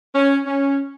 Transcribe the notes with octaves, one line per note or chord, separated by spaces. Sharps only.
C#4
C#4